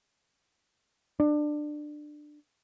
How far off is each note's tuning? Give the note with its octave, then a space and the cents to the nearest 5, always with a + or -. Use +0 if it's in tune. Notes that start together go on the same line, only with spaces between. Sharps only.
D4 +20